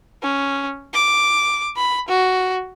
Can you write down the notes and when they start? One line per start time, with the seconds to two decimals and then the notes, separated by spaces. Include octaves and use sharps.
0.23 C#4
0.93 D6
1.77 B5
2.08 F#4